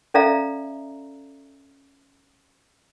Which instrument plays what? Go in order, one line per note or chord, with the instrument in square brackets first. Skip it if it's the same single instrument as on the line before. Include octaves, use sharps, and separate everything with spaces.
[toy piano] C#4 A4 D5 E5 F5 A#5